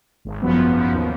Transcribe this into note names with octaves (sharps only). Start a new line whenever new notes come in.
G#1
F#2 F3 B3
G#1
F#2 F3 B3
D#2